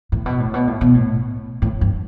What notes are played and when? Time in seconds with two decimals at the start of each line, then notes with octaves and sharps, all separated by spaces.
0.12 A2
0.26 B2
0.40 A2
0.54 B2
0.67 A2
0.81 B2
0.94 A2
1.62 A2
1.81 G2